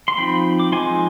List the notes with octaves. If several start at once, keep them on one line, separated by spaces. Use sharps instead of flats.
C6
F3 C4 D#4 G5 B5
D6
F3 G#3 C4 D#4 G#5 C6